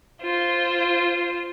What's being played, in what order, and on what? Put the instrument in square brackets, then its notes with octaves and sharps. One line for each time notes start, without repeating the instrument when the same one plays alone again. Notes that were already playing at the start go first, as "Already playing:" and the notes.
[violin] F4 C5